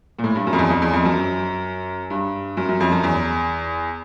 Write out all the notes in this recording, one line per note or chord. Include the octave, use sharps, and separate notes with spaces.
A#2
A2
G2
F#2
F2
E2
F2
E2
F2
F#2
G2
F#2
F#2
F2
F#2
E2